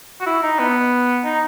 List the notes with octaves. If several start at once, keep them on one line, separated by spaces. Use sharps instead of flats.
F#4
E4
D#4
B3
D#4